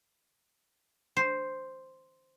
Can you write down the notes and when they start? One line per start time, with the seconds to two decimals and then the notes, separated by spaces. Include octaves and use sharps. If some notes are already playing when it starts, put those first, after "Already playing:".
1.17 C5